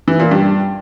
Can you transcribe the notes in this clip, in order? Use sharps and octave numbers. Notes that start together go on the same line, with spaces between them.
E3
A#2
G2